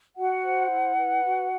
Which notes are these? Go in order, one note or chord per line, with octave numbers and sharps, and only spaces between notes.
F#4 F#5
C5
E4
B4
F#4